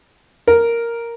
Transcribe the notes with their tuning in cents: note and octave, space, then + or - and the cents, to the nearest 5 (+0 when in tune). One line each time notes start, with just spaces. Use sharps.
A#4 +0